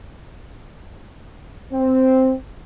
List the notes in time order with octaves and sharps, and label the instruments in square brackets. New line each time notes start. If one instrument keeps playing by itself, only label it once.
[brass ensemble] C4